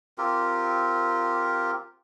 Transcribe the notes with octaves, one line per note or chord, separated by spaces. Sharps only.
C4 F4 G4 A#4